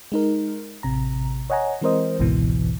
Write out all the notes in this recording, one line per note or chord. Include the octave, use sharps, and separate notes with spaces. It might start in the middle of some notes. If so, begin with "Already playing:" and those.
G#3 D#4 A#4
A1 C3 A#5
C#5 D#5 F#5 G#5 A#5
E3 G#3 C4 A#4 C5 D#5
G#1 C#2 G#2 B2 E3